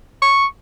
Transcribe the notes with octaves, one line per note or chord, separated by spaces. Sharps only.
C#6